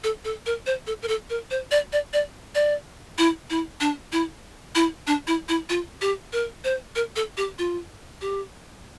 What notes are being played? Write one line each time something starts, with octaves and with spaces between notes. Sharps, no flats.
A4
A4
A#4
C5
A4
A#4
A4
A#4
C5
D5
D5
D5
D5
E4
E4
D4
E4
E4
D4
E4
E4
F4
G4
A#4
C5
A#4
A4
G4
F4
G4